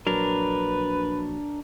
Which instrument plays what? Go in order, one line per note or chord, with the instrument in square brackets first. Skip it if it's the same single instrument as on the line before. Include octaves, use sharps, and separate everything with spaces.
[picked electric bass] A#1 F#3 [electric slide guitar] D4 A#4 [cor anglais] B4